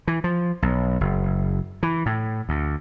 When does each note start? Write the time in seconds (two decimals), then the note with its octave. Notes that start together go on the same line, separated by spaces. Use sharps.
0.08 E3
0.24 F3
0.62 B1
1.01 F#1
1.83 E3
2.06 A2
2.49 D2